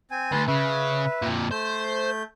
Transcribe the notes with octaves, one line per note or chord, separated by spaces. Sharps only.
C4 G#5
D2 B4 A5 C6
C#3 B4 E5
F2 A#2
A3 C5 G6